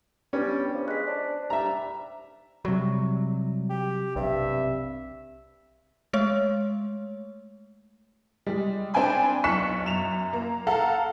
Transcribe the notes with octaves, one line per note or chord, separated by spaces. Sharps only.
G3 B3 C#4 D4 B4
F3
G#3 F#6 B6
D4 C5
G3 E5 A#5
C3 F#3 G3
G4
B1 G2 C3 E5
G#3 A3 C#5
G3 G#3
C4 D4 G5 G#5 B5
B1 C#6 F#6 B6 C#7 E7
F#2 E7 F7
A#3 A#5
A4 F5 F#5 A#5